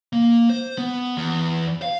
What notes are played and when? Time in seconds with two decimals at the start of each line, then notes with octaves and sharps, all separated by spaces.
0.13 A#3
0.50 C5
0.78 B3
1.17 E2
1.82 F5